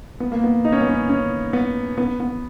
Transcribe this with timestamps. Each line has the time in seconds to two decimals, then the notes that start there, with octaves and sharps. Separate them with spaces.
0.20 B3
0.32 A#3
0.44 B3
0.65 D#4
0.72 C#4
0.81 B3
0.90 C#4
1.09 C#4
1.53 B3
1.98 B3
2.20 B3